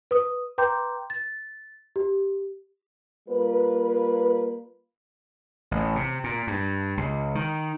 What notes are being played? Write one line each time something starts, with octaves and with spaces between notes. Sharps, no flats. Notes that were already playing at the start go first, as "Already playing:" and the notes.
B4 D#6
B4 G5 A#5 C6 D6 G6
A6
G4
G3 A#3 F4 B4
A1
C3
A#2
G2
C#2
D#3